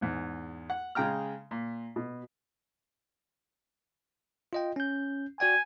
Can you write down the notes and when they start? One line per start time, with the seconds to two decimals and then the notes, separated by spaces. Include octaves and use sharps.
0.01 E2 G#2
0.70 F#5
0.95 C#3 G#3 G5 A#5 F6
1.51 A#2
1.96 B2
4.53 F4 D#5 G5
4.76 C#4 G6
5.40 F#4 D5 G5 G#5